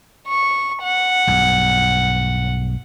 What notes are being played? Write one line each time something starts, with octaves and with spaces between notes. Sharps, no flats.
C#6
F#5
B1 G2